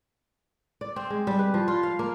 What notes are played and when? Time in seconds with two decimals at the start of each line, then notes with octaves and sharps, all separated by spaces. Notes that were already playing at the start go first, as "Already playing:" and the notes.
0.81 D5
0.96 C4
1.10 G#3
1.27 G3
1.39 B4
1.54 F3
1.68 F4
1.83 F5
1.99 A#3